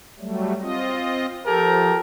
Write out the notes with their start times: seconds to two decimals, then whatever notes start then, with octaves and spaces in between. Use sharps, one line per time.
0.19 F#3 G3 A3
0.61 C4 F4 D#5
1.47 F3 G4 A4 A#4